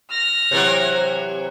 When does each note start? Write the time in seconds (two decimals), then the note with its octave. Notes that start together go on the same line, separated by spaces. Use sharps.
0.11 F6 A#6
0.51 C3 E3 F#3